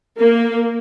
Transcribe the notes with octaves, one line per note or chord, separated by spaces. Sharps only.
A#3